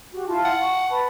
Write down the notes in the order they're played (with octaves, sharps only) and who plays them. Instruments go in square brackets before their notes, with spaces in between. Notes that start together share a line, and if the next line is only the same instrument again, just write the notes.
[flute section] F#4 G4
E4 F4 A5
[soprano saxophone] F#5
[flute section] C#6
B4 A5 B5